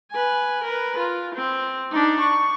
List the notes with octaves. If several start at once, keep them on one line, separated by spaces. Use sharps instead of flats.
B4 G#5
A#4 B4
F4
C4
D4 D#4
C#6